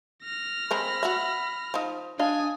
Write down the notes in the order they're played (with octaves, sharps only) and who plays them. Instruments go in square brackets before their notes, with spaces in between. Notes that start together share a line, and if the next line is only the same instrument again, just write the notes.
[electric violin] F6 A#6
[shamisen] G#3 C4 A#4 [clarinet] B5
[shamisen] F#4 E5
F3 D#4
[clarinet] D4 [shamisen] D#5 F5 [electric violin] G#5 D#6